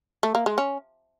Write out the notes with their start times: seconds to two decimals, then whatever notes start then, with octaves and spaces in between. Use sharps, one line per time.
0.23 A3
0.35 A#3
0.46 G#3
0.58 C#4